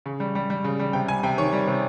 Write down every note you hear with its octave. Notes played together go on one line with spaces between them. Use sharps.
C#3
G3
G3
G3
C#3
G3
C3 G5
G3 G#5
C3 G5
D#3 C#5
G3
C3